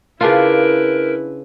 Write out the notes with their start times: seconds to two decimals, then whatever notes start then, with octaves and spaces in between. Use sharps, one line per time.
0.21 C#3 D4 E4 F4 A#4 B4